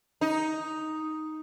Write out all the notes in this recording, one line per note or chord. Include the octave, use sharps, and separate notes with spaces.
D#4